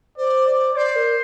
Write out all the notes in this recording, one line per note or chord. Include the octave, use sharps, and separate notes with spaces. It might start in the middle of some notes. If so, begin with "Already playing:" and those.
C5 D5
D5
C5 D5
A#4